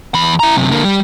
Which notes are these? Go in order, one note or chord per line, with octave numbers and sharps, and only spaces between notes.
E2 B5
E4 A#5
F#2 C3
D3 A#3
G3